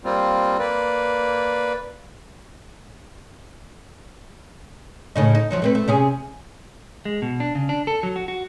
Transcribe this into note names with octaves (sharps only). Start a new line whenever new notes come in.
G3 A#3 C4 F4
A#3 B4 D5
A2 C#3 D#4
D#4
F3 F#3 D#4
A3 C4 B4
A3
C3 C#4 G#4
G#3
B2
D4
C#3
D4
A4
F#3
F#4
F#4